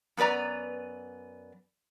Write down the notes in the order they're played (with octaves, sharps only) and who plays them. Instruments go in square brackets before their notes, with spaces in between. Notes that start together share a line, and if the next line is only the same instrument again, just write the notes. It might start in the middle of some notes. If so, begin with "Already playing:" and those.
[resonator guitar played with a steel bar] F#2 B3 B4 D5 A#5